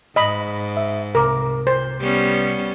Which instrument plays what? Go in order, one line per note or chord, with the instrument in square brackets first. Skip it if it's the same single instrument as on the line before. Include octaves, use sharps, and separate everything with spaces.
[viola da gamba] G#2 [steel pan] D#5 B5
[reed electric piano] E5
[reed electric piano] C2 C3 D6 [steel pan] A#4
[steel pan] C5
[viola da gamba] G3 B3 C#4